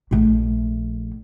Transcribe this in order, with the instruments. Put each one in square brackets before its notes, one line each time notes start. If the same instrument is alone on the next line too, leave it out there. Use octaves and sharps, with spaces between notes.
[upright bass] A#1 A3